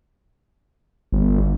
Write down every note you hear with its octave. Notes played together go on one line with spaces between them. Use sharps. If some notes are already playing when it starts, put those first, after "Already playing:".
G1